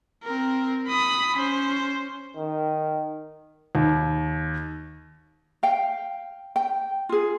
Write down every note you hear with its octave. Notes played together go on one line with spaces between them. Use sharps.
C4 A#4
B5 D#6
C#4 C5
D#3
D#2
F5 G5
G5
F4 G#4